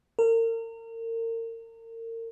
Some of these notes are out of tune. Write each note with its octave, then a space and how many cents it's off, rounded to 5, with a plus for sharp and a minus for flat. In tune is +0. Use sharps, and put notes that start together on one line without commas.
A#4 -35